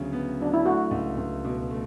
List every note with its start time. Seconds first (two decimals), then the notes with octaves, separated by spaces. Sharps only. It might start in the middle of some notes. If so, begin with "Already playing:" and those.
Already playing: D2 C#3 F#3 B3
0.13 B3
0.40 F#3 D4
0.54 E4
0.66 A3 F#4
0.91 C#2
1.17 C#2
1.44 B2
1.70 A3